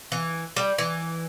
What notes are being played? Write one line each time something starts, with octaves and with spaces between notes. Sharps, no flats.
E3
G3
E3